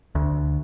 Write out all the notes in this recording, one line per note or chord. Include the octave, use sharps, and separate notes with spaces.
D2